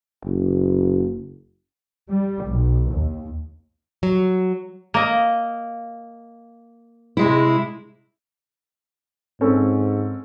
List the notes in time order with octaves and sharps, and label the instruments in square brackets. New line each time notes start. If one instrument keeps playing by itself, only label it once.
[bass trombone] F#1
[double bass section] G3
B1
D#2
[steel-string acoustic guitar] F#3
[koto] A#3 D#5
[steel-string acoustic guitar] C3 G#3 E4
[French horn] G#2 [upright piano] C4 C#4 A4